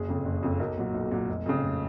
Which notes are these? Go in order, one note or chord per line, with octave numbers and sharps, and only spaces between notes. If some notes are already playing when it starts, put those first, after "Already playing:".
Already playing: F#1 G#4
F2 C#3
F#1
F2 C#3
B1 A#4
A#2 F#3
B1
A#2 F#3
F1
F2 C#3
F1